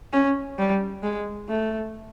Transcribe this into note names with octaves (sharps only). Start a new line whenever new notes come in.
C#4
G3
G#3
A3